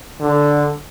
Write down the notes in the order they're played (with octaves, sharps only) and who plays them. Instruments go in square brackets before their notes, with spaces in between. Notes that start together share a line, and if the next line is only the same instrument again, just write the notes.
[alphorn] D3